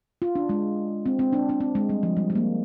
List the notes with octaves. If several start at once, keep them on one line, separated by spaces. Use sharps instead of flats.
F4
D4
G#3
C4
C4
D4
D4
C4
G#3
G3
F3
G3
G#3
A#3